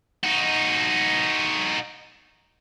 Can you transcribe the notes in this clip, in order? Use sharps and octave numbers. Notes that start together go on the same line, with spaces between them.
D#4 F#4